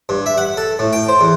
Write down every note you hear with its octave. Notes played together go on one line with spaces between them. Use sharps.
G2
E5
F#5
A4
A2
G5
C5
E2